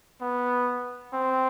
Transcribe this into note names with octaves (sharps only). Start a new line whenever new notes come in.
B3
C4